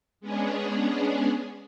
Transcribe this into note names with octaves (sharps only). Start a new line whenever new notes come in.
G#3 B3 C#4 D4 G#4